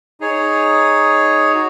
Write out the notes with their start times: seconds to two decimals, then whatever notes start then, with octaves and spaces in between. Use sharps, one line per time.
0.20 D#4 G#4 C#5
1.54 F#4